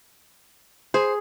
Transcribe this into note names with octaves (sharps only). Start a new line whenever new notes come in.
G#4 C5